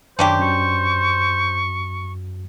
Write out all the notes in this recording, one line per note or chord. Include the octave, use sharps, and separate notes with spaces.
F#2 D#3 C#4 D4 G4 C5 D6
F#2 F#4 C#6 G6